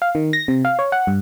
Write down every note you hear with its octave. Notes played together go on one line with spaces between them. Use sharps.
F5
D#3
A#6
C3
F5
C#5
F#5
G2